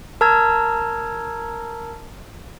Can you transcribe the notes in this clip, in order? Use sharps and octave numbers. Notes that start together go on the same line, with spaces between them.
A#4 A5 A#5 E6 G#6